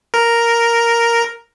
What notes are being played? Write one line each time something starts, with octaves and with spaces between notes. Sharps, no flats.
A#4